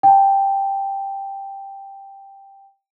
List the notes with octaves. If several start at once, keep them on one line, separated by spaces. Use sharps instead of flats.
G5 A5